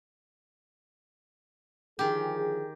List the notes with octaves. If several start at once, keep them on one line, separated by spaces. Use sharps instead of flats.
D3 D#3 F3 G4 G#4